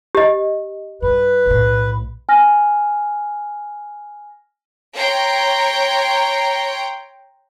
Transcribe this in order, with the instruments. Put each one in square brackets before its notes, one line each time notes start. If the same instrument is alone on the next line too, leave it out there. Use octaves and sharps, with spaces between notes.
[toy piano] G4 D#5
[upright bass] G2 [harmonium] B4
[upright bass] B1 A2
[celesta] G#5 F6 A#6
[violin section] C#5 G5 A#5 C6